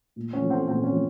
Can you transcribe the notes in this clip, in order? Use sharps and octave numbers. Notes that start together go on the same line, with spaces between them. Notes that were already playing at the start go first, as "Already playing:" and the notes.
A#2
C#4
F3
C4
A#2 C4
C#4
F3